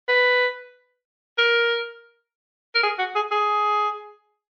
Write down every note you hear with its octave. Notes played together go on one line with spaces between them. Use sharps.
B4
A#4
A#4
G#4
F#4
G#4
G#4